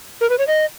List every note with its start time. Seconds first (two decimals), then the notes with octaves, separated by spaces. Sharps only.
0.21 A#4
0.30 B4
0.39 C#5
0.47 D#5